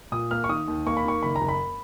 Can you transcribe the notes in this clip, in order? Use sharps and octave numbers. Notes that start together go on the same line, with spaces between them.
A#2 D#6
A#3 F6
C#6
D#3 D#6
D#2
A#3 C#6
B5
D#3 C#6
F#1 B5
A#5
F#1
B5